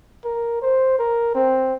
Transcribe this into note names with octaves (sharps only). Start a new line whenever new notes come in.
A#4
C5
A#4
C4